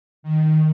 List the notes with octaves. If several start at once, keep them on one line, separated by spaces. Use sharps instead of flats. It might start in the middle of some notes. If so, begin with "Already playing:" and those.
D#3